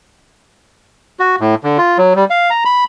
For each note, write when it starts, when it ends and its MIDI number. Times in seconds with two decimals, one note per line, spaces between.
1.20 1.36 66
1.40 1.55 45
1.64 1.78 50
1.78 1.98 65
1.98 2.13 54
2.16 2.25 55
2.30 2.50 77
2.50 2.64 82
2.65 2.84 83